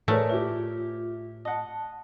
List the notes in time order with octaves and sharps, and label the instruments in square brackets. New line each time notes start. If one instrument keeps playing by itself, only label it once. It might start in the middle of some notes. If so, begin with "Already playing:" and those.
[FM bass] A2 [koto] A3 [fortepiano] G#4 A#4 [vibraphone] B4 C#5 D5
[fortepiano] E4 G4 [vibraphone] F4
[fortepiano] D#5 F#5 [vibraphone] A5